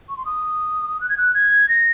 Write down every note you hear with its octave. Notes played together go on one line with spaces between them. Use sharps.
C#6
C6
D#6
F#6
G#6
F#6
G#6
A#6